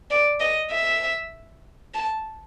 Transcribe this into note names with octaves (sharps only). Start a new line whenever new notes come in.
D5
D#5
E5
A5